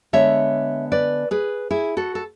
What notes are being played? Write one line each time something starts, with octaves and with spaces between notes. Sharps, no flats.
D3 G#3 B3 C#5 E5
B4 D5
G#4 B4
E4 G#4
F#4 A4
A4